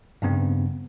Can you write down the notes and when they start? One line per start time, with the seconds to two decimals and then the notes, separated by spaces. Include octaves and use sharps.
0.22 G2 C#3 B3 C4